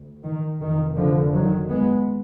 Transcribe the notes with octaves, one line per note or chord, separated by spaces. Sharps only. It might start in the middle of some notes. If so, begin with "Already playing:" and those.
Already playing: D2
D#3
F1 F2 D#3
D3 F3
D#3 F#3
G#3 B3